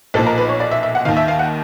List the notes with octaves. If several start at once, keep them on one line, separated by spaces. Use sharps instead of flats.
B1 A#2 F3 A4
A#4
B4
C#5
D5
E5
E5
F#5
D#2 D#3 F5
E5
F5
F#5